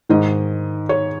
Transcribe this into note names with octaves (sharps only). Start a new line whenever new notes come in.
G#2 D#3 D#5
C#5